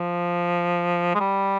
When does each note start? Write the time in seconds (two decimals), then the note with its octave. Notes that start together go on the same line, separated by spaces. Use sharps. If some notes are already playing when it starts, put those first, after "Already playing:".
Already playing: F3
1.14 G#3
1.20 G3